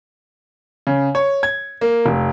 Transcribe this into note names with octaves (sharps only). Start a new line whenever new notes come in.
C#3
C#5
G#6
A#3
F1